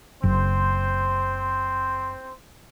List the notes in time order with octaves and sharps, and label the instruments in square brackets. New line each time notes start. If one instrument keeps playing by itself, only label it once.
[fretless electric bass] F#1 [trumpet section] C4 C5